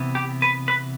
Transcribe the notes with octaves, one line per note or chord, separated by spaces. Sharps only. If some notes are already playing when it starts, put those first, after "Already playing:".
Already playing: C3 E3 B3
G4
B4
B4